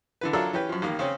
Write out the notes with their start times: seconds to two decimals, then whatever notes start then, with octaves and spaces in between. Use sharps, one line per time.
0.21 D3 E3 B4
0.33 F#3 D4 F4 A4 A#4 E5
0.53 E3 C#4 G4 B4
0.69 F#2 F3
0.82 A1 D#3 A#3
0.99 C#3 C4 C#4